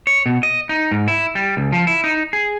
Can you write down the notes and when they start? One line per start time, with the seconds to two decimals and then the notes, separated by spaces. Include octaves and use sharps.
0.07 C#5
0.26 B2
0.43 D#5
0.69 D#4
0.91 G#2
1.08 E4
1.35 G3
1.57 C#2
1.72 F3
1.87 E4
2.04 D#4
2.33 G#4